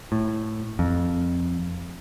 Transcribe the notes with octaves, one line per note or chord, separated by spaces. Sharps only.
A2
F2